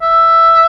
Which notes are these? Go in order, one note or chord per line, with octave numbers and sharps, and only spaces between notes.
E5